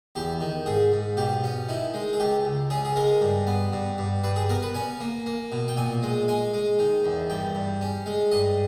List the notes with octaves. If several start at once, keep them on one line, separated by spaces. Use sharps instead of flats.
E2 G4
D#3
G#2 G#4
G#2
B2 G4
C#4
D#3 E4
G#3
G#4
C#2 G4
C#2
C#4 G#4
G#4
G#3 A#4
G2
B3
G2
G2
G2 B4
G#4
B3 A#4
B4
C#4 G#5
A#3
A#3
B2
G5
A#2 G#5
G#3
G#3 G#5
G#3
D#3
E2
G2 G5
G2
C#4
G#3
G2 D#5